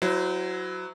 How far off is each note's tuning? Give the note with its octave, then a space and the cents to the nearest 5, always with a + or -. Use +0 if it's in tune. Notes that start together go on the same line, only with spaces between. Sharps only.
F#3 +0 E4 +10 C5 -35